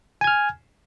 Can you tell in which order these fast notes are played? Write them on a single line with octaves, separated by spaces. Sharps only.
G#5 G#6 F6